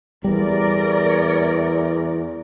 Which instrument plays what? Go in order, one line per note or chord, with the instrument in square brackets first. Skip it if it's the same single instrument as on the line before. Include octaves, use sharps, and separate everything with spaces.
[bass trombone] E2 [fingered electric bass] G3 [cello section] A#4 D5